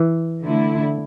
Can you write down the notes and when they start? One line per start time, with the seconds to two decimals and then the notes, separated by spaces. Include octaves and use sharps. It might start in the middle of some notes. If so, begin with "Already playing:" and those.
Already playing: E3
0.43 D3 A3 E4